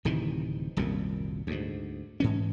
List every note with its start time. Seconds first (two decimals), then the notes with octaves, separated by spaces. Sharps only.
0.05 D1 C3 D#3 E3
0.77 D#1 C2 F#2 A#2
1.47 D2 G#2
2.20 G#2 E3 C#4